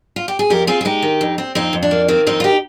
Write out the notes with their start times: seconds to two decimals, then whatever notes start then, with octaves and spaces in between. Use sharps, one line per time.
0.16 F4
0.28 G4
0.39 G#4
0.50 F2 G4 A#4
0.67 C4 F4 G#4
0.81 G#4
0.85 G#3 D#4 G4
1.02 D#3
1.21 F2
1.38 C4
1.55 F2 C4 D#4
1.73 F2
1.83 D4
1.91 A#3
2.08 D#3 C4
2.27 F2 C4 D#4
2.40 F4
2.44 D#4 G4